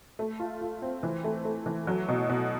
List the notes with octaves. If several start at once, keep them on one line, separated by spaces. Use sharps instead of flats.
A3
F4
F4
C4
E3
A3
A3
E3
F#3
B2
B2